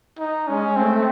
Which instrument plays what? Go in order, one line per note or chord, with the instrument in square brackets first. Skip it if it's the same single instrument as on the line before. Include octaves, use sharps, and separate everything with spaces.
[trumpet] D#4
[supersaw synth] G#3 [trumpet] C#4
[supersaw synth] A3 [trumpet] C4